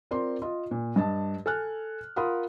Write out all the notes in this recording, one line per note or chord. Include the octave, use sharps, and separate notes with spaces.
C4 F4 A#4 D5 C6
F4 D#5
A#2
G2 D#5 A5
A4 G#5 F6 F#6
F4 A#4 F5 F#5 B5 D#6